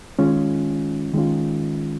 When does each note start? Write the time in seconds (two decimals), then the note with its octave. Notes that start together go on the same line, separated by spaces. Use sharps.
0.19 D#3 G#3 C#4 F4
1.13 D#3 G#3 C#4 F4